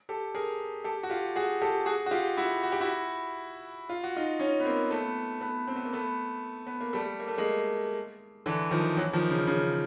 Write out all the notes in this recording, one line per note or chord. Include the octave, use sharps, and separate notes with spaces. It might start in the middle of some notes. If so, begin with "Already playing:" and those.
G4 A4
G#4 A#4
G4 A4
F#4
F4 G4
F#4 G#4
G4 A4
F#4 G#4
F#4
F4 G4
E4 F#4
F#4
G4
E4 F#4
F4
F#4
D#4 F4
C#4 D#4
B3
A#3 C4
A3 B3
A3 B3
C4
B3
A#3
A3 B3
B3
A#3
G3 A3
A#3
A3
G#3 A#3
D3 E3
D#3 F3
E3 F#3
D#3 F3
C#3
C#3